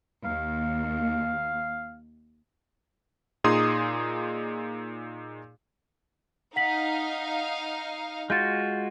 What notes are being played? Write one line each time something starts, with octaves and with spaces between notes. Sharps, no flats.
D#2 F5
A#2 D#4 G#4 C6 D#6
D#4 F5 F#5 B6 F#7
G#3 F4 F#4 G6 A6